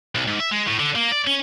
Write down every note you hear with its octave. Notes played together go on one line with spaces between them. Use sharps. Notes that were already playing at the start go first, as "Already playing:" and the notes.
B1
G#2
E5
G#3
A2
D3
A#3
D5
C#4